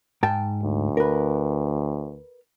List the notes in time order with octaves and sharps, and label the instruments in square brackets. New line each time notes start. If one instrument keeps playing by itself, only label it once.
[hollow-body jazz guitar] G#2 G5 A5
[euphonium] D2
[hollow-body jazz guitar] A#4 B4